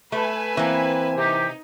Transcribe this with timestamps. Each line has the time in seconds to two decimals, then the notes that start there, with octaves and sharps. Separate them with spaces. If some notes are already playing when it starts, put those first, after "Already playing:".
0.12 A3 B4 E5 G#5
0.57 E3 A#3 C4
1.16 C3 D#4 G4